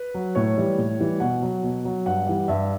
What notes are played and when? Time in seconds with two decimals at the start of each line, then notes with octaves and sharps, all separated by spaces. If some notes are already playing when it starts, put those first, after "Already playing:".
Already playing: B4
0.14 F#3
0.35 A2 C#5
0.58 E3 G3
0.78 A2
0.99 E3 G3
1.20 B2 F#5
1.43 F#3
1.63 B2
1.85 F#3
2.06 G2 F#5
2.26 E3 G3
2.48 G2 E5